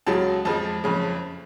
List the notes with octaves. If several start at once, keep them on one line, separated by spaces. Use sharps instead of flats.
C#2 C#3 F#3 A5
F2 F3 G#3 A5
F#1 F2 C#3